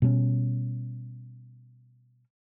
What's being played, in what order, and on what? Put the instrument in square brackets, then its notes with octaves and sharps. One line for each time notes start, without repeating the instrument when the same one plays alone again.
[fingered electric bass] B2 G3 G#3 C#4